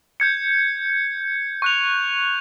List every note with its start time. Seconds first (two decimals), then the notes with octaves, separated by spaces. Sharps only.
0.20 G6 G#6 C#7
1.62 C#6 F#6 F7